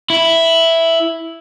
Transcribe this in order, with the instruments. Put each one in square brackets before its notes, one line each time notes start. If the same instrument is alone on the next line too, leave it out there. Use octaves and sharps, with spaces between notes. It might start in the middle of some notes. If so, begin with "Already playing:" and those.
[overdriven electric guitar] E4